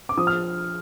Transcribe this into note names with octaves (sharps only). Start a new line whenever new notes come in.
D6
F3 D#6
F6